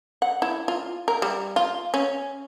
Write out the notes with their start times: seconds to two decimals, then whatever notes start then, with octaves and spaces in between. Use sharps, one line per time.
0.22 F#5
0.42 E4
0.68 F4
1.08 A#4
1.22 G3
1.56 F4
1.94 C#4